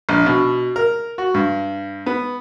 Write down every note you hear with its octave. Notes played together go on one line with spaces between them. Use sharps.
A#1
B2
A#4
F#4
G2
B3